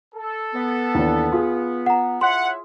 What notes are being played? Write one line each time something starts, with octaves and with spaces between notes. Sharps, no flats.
A4
B3
D#2 E3 D4
F4 G#4
F#5 A#5
E4 C#5 E5 F#5 C6